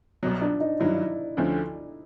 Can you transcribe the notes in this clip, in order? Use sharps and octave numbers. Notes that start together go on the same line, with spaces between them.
C2 B2 F#3
D4
D#4
G2 D#3 F#3 E4
D2 D3 F3 A3 C#4